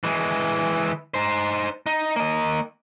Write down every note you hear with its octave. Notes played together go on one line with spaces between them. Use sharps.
E3 G#3
D#4 C5
D#4
A#3 D#5